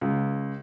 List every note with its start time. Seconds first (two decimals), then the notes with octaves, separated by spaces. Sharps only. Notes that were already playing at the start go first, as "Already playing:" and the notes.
0.01 C#2